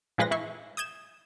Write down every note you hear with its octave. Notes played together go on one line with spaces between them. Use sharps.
A#2 F3 G#3 B4 C6 A#6
E3 E4 C#6 C7
D#6 G6 G#6 E7